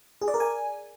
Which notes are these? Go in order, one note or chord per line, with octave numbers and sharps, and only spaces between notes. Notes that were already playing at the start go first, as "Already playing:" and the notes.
G#4
D5
A#4
G#5